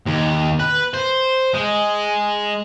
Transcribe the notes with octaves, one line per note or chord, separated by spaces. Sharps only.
D#2
B4
C5
G#3